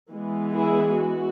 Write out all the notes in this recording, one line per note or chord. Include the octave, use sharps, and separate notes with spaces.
E3 G#3 B3
E4 G#4
F#4